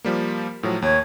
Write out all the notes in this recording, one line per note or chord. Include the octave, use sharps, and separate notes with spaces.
F3 G3 A#3
A2 F3 F#3
D#2 C#5